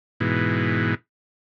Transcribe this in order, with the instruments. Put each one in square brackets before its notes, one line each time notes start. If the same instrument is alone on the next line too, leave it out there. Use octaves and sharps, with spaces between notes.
[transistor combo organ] G#2 B2 E3